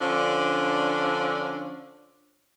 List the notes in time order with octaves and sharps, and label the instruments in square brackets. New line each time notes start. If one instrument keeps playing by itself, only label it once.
[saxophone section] D3 F3 C#4 D4